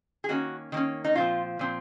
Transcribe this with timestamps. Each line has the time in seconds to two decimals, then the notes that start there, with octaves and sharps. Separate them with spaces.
0.24 G#4
0.29 D#3 A#3 C#4 F#4
0.72 D#3 A#3 C#4
1.05 D#4
1.15 A#2 F3 C4 F4
1.59 A#2 F3 C4